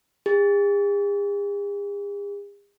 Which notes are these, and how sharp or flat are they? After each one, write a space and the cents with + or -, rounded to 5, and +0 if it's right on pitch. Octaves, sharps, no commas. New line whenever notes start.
G#4 -45